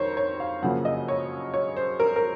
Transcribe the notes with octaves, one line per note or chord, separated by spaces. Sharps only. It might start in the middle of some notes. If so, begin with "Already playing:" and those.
Already playing: F2 D#3 A#4 C5 C#5
C#5
F5
F#2 C#3 F3 A#3 F#5
D#5
C#5
C#5
C5
A#4
A#4